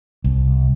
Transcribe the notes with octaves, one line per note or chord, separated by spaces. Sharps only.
C2